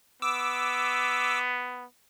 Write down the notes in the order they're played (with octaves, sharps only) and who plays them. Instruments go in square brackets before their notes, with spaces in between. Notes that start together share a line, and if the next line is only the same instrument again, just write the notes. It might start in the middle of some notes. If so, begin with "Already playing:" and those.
[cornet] B3 [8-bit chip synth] D6 E6